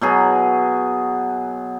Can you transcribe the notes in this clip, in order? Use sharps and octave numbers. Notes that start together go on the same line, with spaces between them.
B2 F#3 G#4